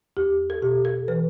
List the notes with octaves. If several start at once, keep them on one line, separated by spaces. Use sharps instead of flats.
E2 G4
A4
B2 G4
A4
E3 B4